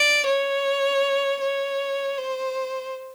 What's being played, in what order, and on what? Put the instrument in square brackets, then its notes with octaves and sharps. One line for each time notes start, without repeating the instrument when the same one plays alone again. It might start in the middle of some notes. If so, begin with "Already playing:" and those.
Already playing: [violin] D5
C#5
C#5
C5